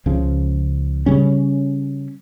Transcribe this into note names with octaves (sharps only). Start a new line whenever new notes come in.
C#2 C#3 F3
C#3 G3 C#4